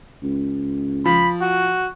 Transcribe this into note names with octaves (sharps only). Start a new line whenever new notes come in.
C#2
F3 B5
F#4